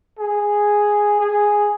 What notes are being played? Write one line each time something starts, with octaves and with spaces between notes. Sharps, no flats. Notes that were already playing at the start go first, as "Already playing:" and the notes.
G#4
G#4